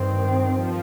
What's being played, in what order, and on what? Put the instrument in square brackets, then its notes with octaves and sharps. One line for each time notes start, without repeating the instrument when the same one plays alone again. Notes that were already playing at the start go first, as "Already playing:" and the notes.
Already playing: [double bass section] G2 D#3 C4
[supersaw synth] F3